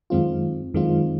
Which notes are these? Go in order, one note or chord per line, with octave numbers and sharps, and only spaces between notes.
F#2 D#3 G#3 C4 F4
F#2 D#3 G#3 C4 F4